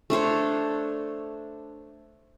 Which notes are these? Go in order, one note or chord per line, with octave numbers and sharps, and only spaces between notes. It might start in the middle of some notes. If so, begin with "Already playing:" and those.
A3 D4 C5 C#5